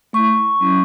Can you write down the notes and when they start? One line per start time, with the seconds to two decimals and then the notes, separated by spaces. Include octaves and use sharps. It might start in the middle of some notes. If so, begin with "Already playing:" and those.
0.13 A3 E4 C#6
0.60 F#3 C#4 E4